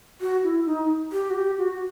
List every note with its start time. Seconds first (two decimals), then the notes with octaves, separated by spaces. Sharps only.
0.21 F#4
0.43 E4
0.66 D#4
1.12 G4
1.30 F#4
1.35 G4
1.58 F#4